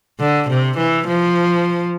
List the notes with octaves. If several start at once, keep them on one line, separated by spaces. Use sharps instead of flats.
D3
C3
E3
F3